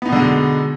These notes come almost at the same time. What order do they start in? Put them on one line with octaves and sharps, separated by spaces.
B3 D#4 B2 D3 G#3